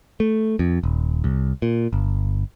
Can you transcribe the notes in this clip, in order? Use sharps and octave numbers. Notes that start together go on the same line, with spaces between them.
A3
F2
D#1
C2
A#2
G1